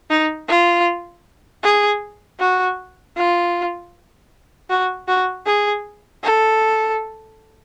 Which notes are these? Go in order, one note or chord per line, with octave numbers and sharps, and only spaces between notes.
D#4
F4
G#4
F#4
F4
F#4
F#4
G#4
A4